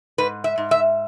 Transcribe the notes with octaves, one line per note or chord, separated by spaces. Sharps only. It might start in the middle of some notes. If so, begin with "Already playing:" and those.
G#2 B4
E5
G#2
E5